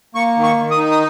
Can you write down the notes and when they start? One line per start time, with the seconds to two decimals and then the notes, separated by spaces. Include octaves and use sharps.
0.15 A#3 C#6
0.36 D#3
0.43 C#6
0.57 D#3
0.71 D#6
0.77 D#4
0.91 D#6